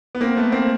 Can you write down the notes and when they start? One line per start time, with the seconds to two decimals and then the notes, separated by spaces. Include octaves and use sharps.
0.15 B3
0.21 A#3 C4
0.37 A3 B3
0.52 A#3 C4